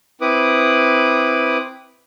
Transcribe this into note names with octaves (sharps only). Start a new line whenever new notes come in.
C4 E4 B4 D6 D#6